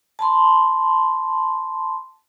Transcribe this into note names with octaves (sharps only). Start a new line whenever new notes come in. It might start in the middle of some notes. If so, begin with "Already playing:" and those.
A5 B5 C6